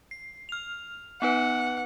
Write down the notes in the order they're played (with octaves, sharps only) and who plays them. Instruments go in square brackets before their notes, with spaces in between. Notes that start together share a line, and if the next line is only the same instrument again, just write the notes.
[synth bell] C7
F6 F7
[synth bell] B3 D#4 B4 [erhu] F#5